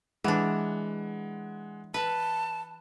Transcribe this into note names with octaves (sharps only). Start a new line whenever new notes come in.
E3 G#3 D4 F#5
B4 A5